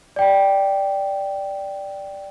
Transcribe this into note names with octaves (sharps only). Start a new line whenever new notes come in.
D5 G5